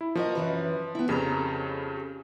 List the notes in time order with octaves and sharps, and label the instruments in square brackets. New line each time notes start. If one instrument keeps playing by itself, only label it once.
[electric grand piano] E4
[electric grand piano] F3 [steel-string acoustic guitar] F#4 A#4 D#5
[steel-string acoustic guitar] F#2 E3 B4
B3 E4
[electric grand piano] F2 C#3 C#4 [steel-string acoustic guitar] G4 A4 A#5